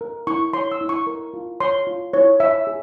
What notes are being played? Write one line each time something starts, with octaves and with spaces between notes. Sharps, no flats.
A#4
E4 C#6
C#5 C6
E6
E4
C#6
A#4
F4
C#5 C6
F4
E4 C#5
C#5 E5
G#4